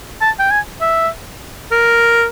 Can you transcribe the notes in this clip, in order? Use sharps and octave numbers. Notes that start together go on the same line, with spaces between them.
A5
G5
G#5
E5
A#4